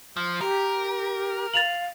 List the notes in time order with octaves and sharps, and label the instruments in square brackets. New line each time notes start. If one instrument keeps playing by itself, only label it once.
[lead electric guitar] F3
[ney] G4 [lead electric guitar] A#4
[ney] F5 [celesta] A6 F7 F#7